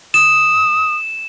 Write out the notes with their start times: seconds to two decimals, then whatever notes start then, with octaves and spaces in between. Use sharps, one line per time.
0.14 D#6 E7